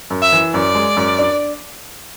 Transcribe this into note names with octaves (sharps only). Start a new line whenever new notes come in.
F#2
E5
E3
F#2 D5
G#3
F#2
D4